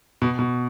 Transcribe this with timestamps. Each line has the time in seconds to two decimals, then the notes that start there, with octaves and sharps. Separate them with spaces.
0.22 B2
0.39 B2